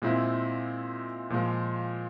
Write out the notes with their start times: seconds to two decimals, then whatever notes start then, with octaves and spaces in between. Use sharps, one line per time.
0.02 A#2 G#3 C4 E4
1.30 A#2 F3 G#3